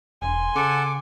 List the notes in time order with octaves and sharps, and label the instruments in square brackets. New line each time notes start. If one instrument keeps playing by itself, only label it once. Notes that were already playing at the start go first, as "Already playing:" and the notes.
[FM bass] E1 [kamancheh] G#5 C6
[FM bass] C#3 [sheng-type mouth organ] A4 F#5 [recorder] D6